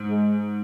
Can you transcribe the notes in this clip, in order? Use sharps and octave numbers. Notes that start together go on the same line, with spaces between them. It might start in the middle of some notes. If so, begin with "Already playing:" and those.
Already playing: G#2
G#3